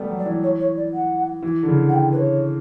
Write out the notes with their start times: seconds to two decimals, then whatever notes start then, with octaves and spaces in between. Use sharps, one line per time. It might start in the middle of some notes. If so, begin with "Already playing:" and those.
Already playing: G3 A3 B3
0.10 F#3
0.18 D5
0.26 E3
0.43 C#5
0.60 C#5
0.77 D5
0.94 F#5
1.43 E3
1.63 D3
1.68 C#3
1.89 F#5
1.94 G5
2.12 B4
2.18 C#5